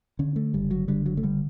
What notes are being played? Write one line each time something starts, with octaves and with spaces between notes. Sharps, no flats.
D3 C#4
A3
F#1 G3
F#3
D3 G3
F#3
A3
D3 G3